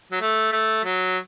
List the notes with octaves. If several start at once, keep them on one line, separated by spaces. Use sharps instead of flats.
F#3
A3
A3
F#3